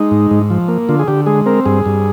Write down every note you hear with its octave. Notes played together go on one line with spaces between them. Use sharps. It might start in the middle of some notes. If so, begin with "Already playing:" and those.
Already playing: G#3 D#4
G#2
G#2
F3
A#3
D3 F4
G#4
D3 G4
G#3 G#4
C4 A#4
G2 G#4
G2